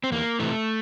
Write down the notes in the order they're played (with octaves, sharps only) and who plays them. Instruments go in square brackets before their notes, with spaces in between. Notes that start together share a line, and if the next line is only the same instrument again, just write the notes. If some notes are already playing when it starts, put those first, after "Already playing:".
[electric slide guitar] C4
E2 A#3
C3 E3 A3